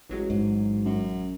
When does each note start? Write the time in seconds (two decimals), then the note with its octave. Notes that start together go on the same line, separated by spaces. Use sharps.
0.09 A1 F#3 G#3
0.30 G#2
0.85 F#2